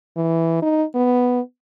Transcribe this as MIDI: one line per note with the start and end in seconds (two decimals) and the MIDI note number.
0.17 0.58 52
0.62 0.84 63
0.95 1.41 59